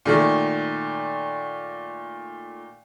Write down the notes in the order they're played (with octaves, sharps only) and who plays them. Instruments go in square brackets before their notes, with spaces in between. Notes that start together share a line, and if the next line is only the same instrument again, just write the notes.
[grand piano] A#2 D#3 A3